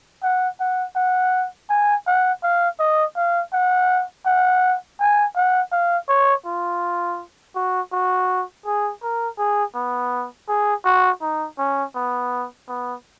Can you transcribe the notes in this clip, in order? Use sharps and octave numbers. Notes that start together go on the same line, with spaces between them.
F#5
F#5
F#5
G#5
F#5
F5
D#5
F5
F#5
F#5
G#5
F#5
F5
C#5
F4
F#4
F#4
G#4
A#4
G#4
B3
G#4
F#4
D#4
C#4
B3
B3